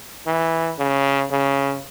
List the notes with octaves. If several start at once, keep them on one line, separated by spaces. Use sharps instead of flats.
E3
C#3
C#3